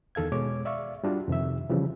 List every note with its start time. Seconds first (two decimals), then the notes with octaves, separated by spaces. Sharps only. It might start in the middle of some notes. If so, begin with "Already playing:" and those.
0.15 E2 D#3 A4 F5 G#6
0.32 B2 G#3 C#5 D6
0.65 D5 E5 F5 C#6
1.04 G3 D4 F4 F#4
1.28 F2 C3 D#3 E5
1.69 C#3 E3 F3 G3